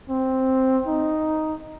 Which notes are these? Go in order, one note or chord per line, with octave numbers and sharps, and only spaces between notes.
C4
D#4